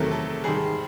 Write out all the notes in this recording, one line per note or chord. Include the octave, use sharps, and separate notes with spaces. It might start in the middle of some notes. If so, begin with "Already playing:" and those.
Already playing: E2 C3 D#3 F#3 A3 A#4
A4
G#2 D#3 G3 G#4